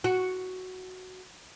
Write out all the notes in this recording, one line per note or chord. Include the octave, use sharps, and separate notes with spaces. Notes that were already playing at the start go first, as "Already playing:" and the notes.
F#4